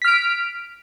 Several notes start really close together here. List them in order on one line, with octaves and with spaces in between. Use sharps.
B6 F6 D7